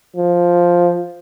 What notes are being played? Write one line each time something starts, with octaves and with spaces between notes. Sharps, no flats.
F3